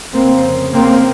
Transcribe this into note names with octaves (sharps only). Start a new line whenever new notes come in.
F1 F2 C#3 A#3 C4
A#3 C4